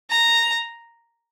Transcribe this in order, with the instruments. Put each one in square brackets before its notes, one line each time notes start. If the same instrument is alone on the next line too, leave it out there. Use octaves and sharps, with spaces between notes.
[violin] A#5